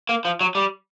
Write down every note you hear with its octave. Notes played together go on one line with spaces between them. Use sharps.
A#3
F3
F#3
G3